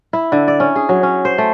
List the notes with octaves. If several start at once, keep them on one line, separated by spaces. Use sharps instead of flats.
E4
D3
D5
C#4
G#4
F#3
C#4
C5
A3